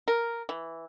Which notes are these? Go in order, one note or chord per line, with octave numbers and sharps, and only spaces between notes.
A#4
E3